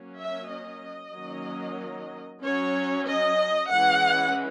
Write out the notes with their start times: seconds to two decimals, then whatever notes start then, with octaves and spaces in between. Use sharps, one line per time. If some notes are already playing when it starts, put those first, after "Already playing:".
Already playing: F#3 A#3 C#4
0.19 E5
0.51 D#5
1.15 D#3 F#3 A#3 C#4
2.43 F#3 C#4 C#5
3.07 D#5
3.71 E3 G#3 C#4 F#5